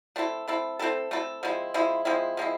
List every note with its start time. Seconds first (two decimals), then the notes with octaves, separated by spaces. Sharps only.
0.16 A3 C4 E4 A4
0.48 A3 C4 E4 A4
0.79 A3 C4 E4 A4
1.11 A3 C4 E4 A4
1.43 F3 G#3 C4 E4
1.74 F3 G#3 C4 E4
2.05 F3 G#3 C4 E4
2.37 F3 G#3 C4 E4